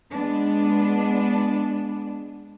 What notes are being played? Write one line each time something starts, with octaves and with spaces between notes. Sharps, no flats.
G#3 B3 D4